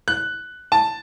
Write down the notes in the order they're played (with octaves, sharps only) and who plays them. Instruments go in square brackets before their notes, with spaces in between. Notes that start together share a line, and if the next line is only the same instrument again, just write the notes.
[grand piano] F#6
A5